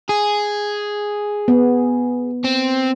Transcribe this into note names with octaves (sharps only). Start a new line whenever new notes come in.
G#4
B3
C4